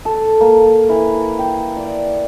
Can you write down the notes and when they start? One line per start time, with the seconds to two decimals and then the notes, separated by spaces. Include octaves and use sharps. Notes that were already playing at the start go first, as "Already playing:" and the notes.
0.05 A4
0.41 A#3
0.89 E3
1.39 G5
1.77 D5